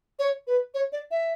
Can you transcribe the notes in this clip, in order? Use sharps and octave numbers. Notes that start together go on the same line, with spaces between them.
C#5
B4
C#5
D5
E5